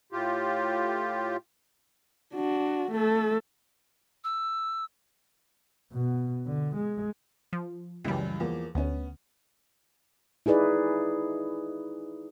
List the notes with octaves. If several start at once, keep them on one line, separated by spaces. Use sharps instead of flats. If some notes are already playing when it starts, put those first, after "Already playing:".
A2 F4 G4
D4 F#4
A3 A4
E6
B2
D3
G#3
F3
C#2 F#2 E3 G3
E2 F3 A#3
D2 B3 C#4
D#4 E4 G#4 B4 D5